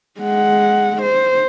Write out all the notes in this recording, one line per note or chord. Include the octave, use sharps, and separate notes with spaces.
G#3 F#5
C5